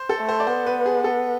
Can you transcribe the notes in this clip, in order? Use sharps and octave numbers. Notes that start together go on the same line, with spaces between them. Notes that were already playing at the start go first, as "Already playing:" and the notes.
Already playing: C5
A4
A3
C5
D5
B3 C5
B4
G#4
A4